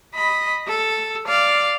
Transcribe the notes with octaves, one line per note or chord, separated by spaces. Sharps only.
D#5 B5
A4
D5 F5